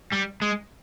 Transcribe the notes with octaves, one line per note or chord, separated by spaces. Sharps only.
G3
G#3